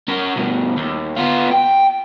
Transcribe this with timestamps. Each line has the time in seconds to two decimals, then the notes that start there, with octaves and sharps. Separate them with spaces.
0.08 C#4 A#4
0.36 G2 B2
0.77 D#2
1.17 B3 F4
1.51 G5